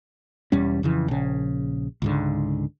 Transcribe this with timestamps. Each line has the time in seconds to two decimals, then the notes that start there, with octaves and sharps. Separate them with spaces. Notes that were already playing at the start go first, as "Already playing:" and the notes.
0.52 E1 E2 G3 C#4
0.83 F2 C#3 E3
1.08 A#1 C#3
2.02 C#2 G#2 D3